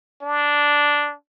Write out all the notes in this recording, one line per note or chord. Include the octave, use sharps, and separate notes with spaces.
D4